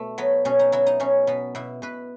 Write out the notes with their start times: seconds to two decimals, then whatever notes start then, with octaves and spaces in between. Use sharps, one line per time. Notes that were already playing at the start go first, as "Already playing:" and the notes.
Already playing: B2 A3
0.18 F#3 B3
0.45 B2 C#4
0.59 D#4
0.72 F#3 E4
0.87 D#4
1.00 B2 C#4
1.27 B2 B3
1.55 B2 E4
1.82 B2 B4